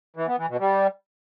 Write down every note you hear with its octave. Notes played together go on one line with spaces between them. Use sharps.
E3
B3
E3
B2
G3